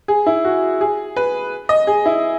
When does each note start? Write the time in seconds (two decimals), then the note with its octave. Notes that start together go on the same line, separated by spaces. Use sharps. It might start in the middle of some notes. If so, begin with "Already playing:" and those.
0.08 G#4
0.26 E4
0.45 F#4
0.81 G#4
1.16 B4
1.69 D#5
1.87 G#4
2.06 E4